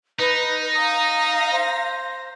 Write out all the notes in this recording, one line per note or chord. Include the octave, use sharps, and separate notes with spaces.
D#4 B4
F5 A#5 D#6 A#6
C5